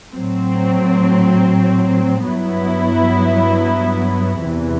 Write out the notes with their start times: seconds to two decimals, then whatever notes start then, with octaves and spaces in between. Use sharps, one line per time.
0.14 A2 F#3 C4
2.27 G2 F#3 B3 E4
4.42 E2 C3 E3